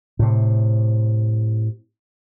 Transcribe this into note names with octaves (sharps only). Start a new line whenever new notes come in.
A2 C3